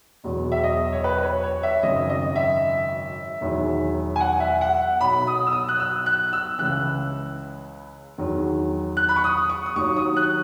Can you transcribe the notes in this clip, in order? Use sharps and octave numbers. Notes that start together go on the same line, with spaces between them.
E1 E2 B2 F#3
E5
D#5
C#5
B4
B4
C#5
C#5
E5
G#1 F#2 C#3 F#3 D#5
D#5
E5
E1 E2 D#3 F#3
G#5
F#5
E5
F#5
B1 B2 F#3 B5
D#6
E6
D#6
F#6
E6
F#6
E6
C#2 C#3 E3 F#6
E2 D#3 F#3
F#6
B5
C#6
D#6
C#6
D#6
D#2 D#3 F#3 C#6
D#6
F#6